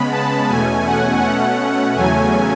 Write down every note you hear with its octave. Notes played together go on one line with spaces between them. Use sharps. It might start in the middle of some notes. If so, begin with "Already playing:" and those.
Already playing: C#3 G#3 B3 B5
A5
E2 B2 A3 C#4 G#5
F#5
B2 A3 C#4 F#5
E2 C#3 F#3 A3 C#4 G#5